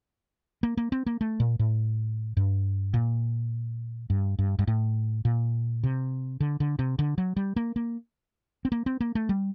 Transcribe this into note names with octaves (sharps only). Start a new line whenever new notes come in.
A#3
A#3
C4
A#3
A3
A#2
A2
G2
A#2
G2
G2
G2
A2
A#2
C3
D3
D3
C3
D3
F#3
G3
A#3
A#3
C4
A#3
C4
A#3
A3
G3